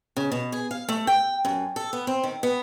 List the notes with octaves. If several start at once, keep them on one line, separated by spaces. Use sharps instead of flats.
C#3
B2
G#4
F5
A3
G5
F#2
A4
B3
C4
D#3
B3